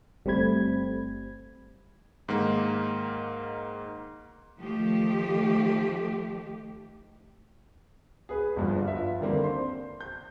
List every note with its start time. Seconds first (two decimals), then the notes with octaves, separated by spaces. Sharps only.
0.25 G1 G3 A3 C4 B5 G#6
2.28 G#2 D#3 A#3
4.58 D#3 F3 A3 G4
8.29 G#4 B4
8.56 G1 G2 F3
8.86 F4 B4 E5
9.20 D3 D#3 G3 A#3 C4
9.44 C5 C6
10.01 G6